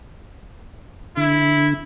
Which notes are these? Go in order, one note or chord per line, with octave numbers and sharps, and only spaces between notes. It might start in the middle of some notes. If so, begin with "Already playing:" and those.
D3 E4